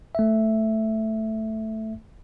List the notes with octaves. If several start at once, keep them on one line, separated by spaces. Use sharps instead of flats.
A3 E5